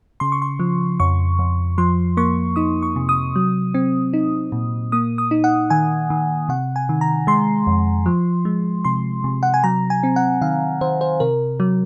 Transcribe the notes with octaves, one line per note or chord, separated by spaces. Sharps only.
C#3 C6
C#6
C6
F3
F2 C#6
F2
F3 C6
A#3 C#6
D#4 D#6
C#6
C3
D#6
F#3
C4
D#4
A#2
A#3 D#6
D#6
D#4
F#5
D#3 G#5
D#3
C3 F#5
G#5
D#3
A#5
G#3 C6
F2
F3
G#3
C3 C6
C3
F#5
G#5
F#3 A#5
G#5
C4
F#5
D#3 F5
D#3 C5
C5
C3 A#4
F#3